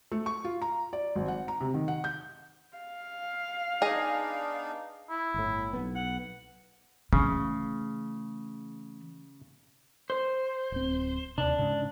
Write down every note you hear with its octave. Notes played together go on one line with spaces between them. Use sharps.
A3
C#6
F4
A#5
D5
G#1
F#5
A#5
C3
D#3
F#5
G6
F5
B3 D4 D#4 G#4 D#5
E4
G1 A2
B1 B3
F#5
C#3 E3 A3
C5
D1 C4
D#2 C3 D4
G#2 C#3